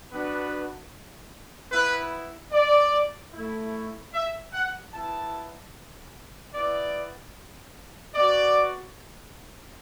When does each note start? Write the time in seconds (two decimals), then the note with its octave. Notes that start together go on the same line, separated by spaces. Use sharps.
0.11 B3 D4 F#4 B4
1.71 B3 E4 B4
2.52 D5
3.32 A3 E4
4.14 E5
4.53 F#5
4.94 B3 E4 A5
6.54 B3 E4 D5
8.15 B3 F#4 D5